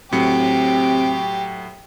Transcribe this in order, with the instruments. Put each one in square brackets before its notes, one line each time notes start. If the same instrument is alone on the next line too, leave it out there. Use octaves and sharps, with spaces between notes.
[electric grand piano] A2 F#3 C#7 [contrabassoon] C3 [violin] G4